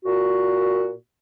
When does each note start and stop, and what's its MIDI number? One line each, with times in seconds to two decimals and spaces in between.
0.05 0.92 46
0.05 0.92 66